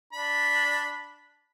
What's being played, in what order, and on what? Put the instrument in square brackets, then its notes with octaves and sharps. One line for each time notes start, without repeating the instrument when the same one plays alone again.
[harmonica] D4 B5